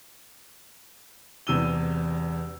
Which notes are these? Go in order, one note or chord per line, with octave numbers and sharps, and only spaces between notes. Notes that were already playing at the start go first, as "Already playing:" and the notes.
E1 E2 C3 E6 D#7 G7